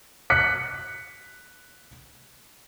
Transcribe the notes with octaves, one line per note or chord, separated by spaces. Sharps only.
F#6 B6 C#7